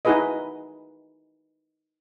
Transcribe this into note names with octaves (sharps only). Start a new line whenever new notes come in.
D#4 E4 F#4 G#4 B4 D#5